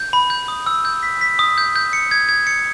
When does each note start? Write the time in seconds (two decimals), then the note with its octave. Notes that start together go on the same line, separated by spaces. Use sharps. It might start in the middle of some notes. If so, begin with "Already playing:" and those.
Already playing: G6
0.13 B5
0.30 G6
0.48 D#6
0.67 E6
0.85 G6
1.03 B6
1.21 B6
1.39 D#6
1.58 G6
1.76 G6
1.93 C#7
2.11 G#6
2.29 G#6
2.47 C#7